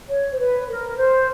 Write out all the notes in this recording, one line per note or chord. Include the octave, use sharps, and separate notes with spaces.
C#5
C5
B4
A#4
C5